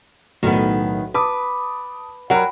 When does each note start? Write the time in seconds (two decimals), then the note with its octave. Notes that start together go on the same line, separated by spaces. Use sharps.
0.43 B1 A2 D#3 B3
1.14 B4 A5 D6 D#6
2.30 F#3 A#4 F#5 G5 B5